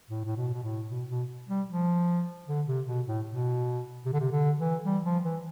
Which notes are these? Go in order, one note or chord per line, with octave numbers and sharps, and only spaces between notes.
A2
A2
B2
B2
A2
B2
B2
G3
F3
D3
C3
B2
A2
B2
C3
D3
C3
D3
E3
G3
F3
E3